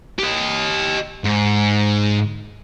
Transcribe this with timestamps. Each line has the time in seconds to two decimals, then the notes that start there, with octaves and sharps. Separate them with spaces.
0.19 G4 D#5
1.24 G#2